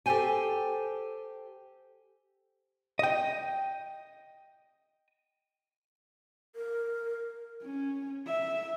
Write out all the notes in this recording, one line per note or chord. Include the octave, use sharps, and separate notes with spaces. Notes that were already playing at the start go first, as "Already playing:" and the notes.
G4 A4 A#4 C5 G5 G#5
D#5 G5
A#4
C#4
E5